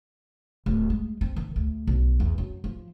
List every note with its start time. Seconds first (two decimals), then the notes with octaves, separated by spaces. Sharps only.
0.66 D1
0.90 G#3
1.21 C4
1.36 D#3
1.56 D2
1.87 B1
2.20 E2
2.38 F#2
2.64 F3